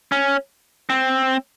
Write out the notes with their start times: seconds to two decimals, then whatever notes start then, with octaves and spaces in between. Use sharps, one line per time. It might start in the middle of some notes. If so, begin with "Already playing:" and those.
0.12 C#4
0.90 C4